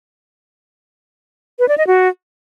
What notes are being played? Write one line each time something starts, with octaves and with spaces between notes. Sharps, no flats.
B4
D5
D#5
F#4